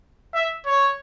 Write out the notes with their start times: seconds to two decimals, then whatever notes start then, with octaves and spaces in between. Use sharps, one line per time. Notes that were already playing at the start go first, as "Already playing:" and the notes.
0.34 E5
0.66 C#5